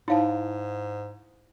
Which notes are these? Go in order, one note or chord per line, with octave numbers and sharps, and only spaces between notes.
G#2 D#4 E4 C#5 F5 A5